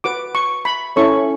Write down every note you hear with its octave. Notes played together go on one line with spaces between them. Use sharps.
F#4 B4 D6
C#6
B5
C#4 E4 A4 C#5 C#6